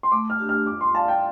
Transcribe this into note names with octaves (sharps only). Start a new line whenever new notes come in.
C6
A3 D6
F6
D4 G4
F6
F4 D6
C6
D5 F5 A5
G5